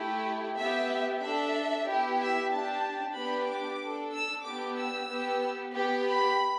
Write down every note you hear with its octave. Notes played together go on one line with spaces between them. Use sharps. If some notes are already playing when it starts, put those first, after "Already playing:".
Already playing: A3 E4 G4
B3 G4 E5
D4 A4 E5
B3 E4 G4
E5
D4 G4 A5
B3 D4 G4 B5
D6
D4 A4
E6
B3 D4 G4 D6
E6
B3 G4
B3 G4
B5